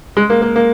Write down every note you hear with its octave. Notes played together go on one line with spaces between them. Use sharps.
G#3
A#3
A#3
A#3